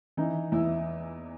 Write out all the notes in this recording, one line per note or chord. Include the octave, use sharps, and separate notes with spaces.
E3 D#4
E2 E4